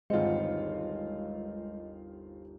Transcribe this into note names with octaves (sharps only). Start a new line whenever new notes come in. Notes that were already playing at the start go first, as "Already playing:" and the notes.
G1 D#2 G#3 C4 F4 D#5 C#7